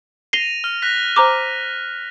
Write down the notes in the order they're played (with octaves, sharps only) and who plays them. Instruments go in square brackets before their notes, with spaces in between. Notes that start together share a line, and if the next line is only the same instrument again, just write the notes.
[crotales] A#6 D#7 F7 [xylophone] C7 G7
[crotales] F6
F#6 A#6 B6
[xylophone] C5 A#5 D6